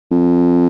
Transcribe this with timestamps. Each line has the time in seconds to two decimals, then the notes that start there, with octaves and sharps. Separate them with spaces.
0.11 F2